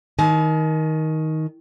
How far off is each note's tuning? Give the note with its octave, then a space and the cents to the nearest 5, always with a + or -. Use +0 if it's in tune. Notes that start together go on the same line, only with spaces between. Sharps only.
D#3 +15 G#5 +45